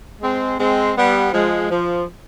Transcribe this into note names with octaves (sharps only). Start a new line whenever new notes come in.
G#3 C4
G#3 C4
G3 B3
F3 G#3
F3